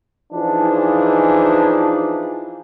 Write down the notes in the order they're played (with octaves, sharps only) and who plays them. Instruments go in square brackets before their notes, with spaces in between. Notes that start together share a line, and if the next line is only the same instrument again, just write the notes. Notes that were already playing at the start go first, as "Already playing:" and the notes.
[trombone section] E3 F3 D4 D#4 G#4